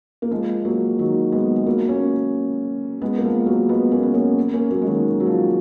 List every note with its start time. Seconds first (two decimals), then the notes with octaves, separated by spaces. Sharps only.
0.22 A#3
0.31 F3 G#3
0.65 F#3 A#3
0.99 D#3 F#3
1.32 G#3 B3
1.56 G#3
1.66 F#3 A#3
1.89 A#3 C#4
3.02 G#3 B3
3.18 A#3
3.24 F3 G#3
3.46 F#3 A#3
3.69 G#3 B3
3.92 A#3 C#4
4.03 B3
4.14 A#3 C#4
4.53 A#3 C#4
4.71 F#3 A#3
4.82 G#3
4.87 D#3 F#3
5.20 F#3
5.27 F3